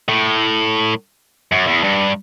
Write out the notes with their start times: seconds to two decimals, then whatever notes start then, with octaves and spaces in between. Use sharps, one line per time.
0.08 A2
1.52 F#2
1.67 E2
1.83 G2